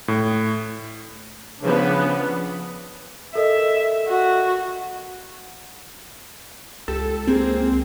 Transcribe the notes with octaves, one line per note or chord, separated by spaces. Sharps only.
A2
C#3 F3 B3 D4 B4
A4 A#4 D#5 E5
F#4
C#2 G4 A4
A#3 C4 G4 G#4